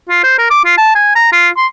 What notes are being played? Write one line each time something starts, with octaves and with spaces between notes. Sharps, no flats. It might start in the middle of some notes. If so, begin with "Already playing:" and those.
F4
C5
A#4
D6
F4
A5
G#5
A#5
F4
C6